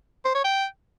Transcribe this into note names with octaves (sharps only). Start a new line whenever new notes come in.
C5
C#5
G5